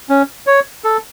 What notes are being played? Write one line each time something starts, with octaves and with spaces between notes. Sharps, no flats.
C#4
C#5
A4